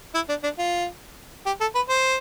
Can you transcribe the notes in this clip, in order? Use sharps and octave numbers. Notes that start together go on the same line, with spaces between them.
E4
D4
D4
F4
G4
A4
B4
C5